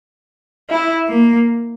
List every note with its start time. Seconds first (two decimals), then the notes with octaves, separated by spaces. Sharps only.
0.70 E4
1.08 A#3